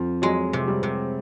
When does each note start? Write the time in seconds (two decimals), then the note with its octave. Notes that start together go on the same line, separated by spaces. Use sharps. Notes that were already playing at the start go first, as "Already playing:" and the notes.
Already playing: F2 F3
0.22 F#3 G#3
0.53 C3
0.67 G3
0.83 C3